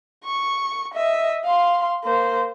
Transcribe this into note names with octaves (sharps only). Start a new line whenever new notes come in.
C#6
D#5 E5
F5 C6
A#3 C5